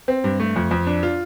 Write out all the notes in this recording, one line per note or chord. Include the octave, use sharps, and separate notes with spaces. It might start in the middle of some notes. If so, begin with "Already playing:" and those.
C4
G2
A3
F2
F2
D4
F4